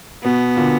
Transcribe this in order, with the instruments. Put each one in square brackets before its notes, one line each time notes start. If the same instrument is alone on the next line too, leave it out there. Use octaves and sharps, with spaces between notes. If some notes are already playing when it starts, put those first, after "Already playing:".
[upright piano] B2 [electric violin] B3
[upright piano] A#2 D3